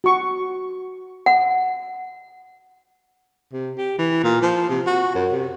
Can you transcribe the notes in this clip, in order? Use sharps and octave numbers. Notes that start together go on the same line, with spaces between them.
F#4 C#6
F#5
C3
G4
E3
A#2
F3
C3
F#4
F#2
C3